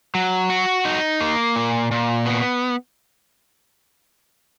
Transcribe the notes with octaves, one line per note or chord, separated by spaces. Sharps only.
F#3
F#4
D#4
A#3
A#2
A#2
B3